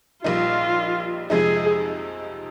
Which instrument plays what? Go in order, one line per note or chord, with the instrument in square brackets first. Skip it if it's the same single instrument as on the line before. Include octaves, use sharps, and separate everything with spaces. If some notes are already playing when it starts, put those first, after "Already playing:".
[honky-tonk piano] A#1 A#2 G3 A#3 D#4 [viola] F4
[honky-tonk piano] F2 C3 F3 G#3 D#4 [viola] G#4